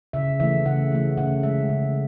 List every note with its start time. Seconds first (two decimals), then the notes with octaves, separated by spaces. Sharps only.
0.13 C#3 E5
0.40 E3 A3 E5
0.66 C#3 F#5
0.92 E3 A3
1.17 C#3 F#5
1.43 G#3 E5
1.69 C#3